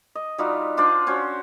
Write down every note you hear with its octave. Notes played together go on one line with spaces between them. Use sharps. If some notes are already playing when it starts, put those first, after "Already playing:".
D#5
G3 D#4 F4 F#4
D4 F4 C5 D5
C#4 F#4 C5